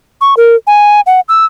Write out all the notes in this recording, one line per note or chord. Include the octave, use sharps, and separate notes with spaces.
C#6
A#4
G#5
F#5
E6